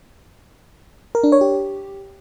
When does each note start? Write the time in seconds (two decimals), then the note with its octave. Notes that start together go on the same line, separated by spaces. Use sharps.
1.15 A#4
1.24 D4
1.32 C#5
1.41 G4